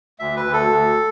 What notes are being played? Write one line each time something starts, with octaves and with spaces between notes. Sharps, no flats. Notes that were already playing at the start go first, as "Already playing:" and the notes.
D2 E5
B4
D2
A4
D2